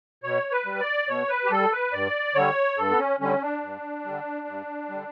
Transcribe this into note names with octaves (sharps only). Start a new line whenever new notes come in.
B2 C#5
B4
G3
D5
B2 C#5
B4
G4
G3 A4
B4
G2 D5
D3 G3 C#5
G2 A4
B3
C#4
D3 G3 C#4
D4
G2
D3 G3
G2
D3 G3